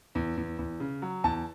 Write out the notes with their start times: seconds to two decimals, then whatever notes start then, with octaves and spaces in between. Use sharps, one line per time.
0.15 E2
0.37 E2
0.59 E2
0.80 C#3
1.02 F#3
1.24 E2 A5